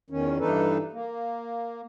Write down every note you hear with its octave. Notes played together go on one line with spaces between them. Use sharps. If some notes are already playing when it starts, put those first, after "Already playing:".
E2 D#3 C#4
G2 E3 D4 D#4 A4 B4
A#3